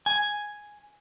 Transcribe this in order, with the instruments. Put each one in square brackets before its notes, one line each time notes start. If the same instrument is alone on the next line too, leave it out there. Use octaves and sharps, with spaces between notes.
[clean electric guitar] G#5